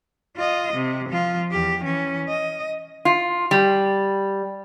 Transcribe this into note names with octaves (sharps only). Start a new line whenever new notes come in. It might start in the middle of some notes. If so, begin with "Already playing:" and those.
F4 D#5
C3
F3 F4
E2 G4
E3 C#4
D#5
F4
G3